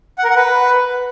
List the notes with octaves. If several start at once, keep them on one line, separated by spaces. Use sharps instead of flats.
F#5
A#4
F#5
B4